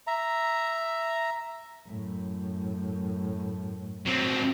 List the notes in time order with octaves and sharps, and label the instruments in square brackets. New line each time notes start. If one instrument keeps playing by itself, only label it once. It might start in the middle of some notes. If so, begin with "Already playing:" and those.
[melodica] E5 A#5
[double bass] F#2 A2
[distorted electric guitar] F#3 C4